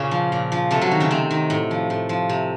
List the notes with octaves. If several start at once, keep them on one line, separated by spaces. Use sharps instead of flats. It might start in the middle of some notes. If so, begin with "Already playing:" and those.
Already playing: A#2 C#3 C#4
F3
A#2
F3
C3 A3 A4
F#3 F#4
D#3
C#3 C#4
C3 C4
D#3
A2
F3
A2
F3
C3